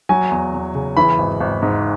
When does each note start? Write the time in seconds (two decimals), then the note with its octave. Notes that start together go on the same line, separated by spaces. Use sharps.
0.09 F#3 G#5
0.31 E2
0.53 E2
0.75 C#3
0.97 E3 B5
1.18 G#1
1.41 G#1
1.62 G#2